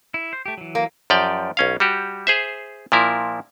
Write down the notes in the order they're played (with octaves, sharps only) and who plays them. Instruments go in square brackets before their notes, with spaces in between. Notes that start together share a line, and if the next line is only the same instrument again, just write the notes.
[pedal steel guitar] E4
C5
A3 G4
E3 F#3
[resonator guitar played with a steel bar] A#3
[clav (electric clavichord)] F#2 F3 G4 D5 G5
B1 C#4 F5
G3 F#4 G4
G#4 C5 E5
A#2 F3 E4 A#4